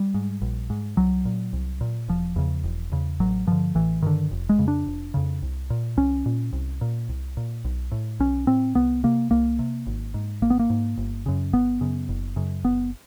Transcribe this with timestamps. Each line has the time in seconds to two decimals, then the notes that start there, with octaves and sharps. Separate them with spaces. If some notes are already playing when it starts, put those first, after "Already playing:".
Already playing: G3
0.14 G#2
0.42 A#1
0.70 G#2
0.97 C2 F#3
1.25 A#2
1.53 C2
1.81 A#2
2.08 E1 F3
2.36 E2 C#3
2.64 E1
2.92 E2 C#3
3.20 A1 F#3
3.47 G2 D3 F3
3.75 A1 E3
4.02 G2 D3 D#3
4.31 F1
4.49 G#3
4.58 F2 C#3
4.68 D4
4.87 F1
5.14 F2 C#3
5.42 C2
5.70 A#2
5.97 C2 C#4
6.26 A#2
6.53 C2
6.81 A#2
7.09 C2
7.37 A#2
7.65 B1
7.92 A2
8.20 B1 C#4
8.47 A2 C4
8.75 C2 B3
9.04 C3 A#3
9.31 C2 A#3
9.59 C3
9.87 G#1
10.14 G#2
10.42 G#1 A#3
10.50 B3
10.59 A#3
10.70 G#2
10.98 G1
11.26 F#2 C#3
11.53 G1 B3
11.81 F#2 C#3
12.09 F#1
12.36 F#2 C#3
12.65 F#1 B3